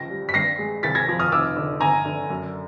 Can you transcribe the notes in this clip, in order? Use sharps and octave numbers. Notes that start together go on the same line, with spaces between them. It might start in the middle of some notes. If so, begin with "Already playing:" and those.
Already playing: C#2 F3 A#6
G3
B6
G2 A#6 C7
G#3
C2 A6 B6
G#6 A#6
F3
D#6 F6
F1 D6 E6
D3
G1 G#5 A#5
D3
F#2